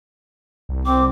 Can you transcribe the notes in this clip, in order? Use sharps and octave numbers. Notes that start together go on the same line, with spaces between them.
C2
C4 D6